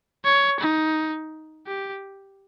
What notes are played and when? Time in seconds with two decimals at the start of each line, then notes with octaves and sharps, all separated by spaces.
0.25 C#5
0.60 D#4
1.67 G4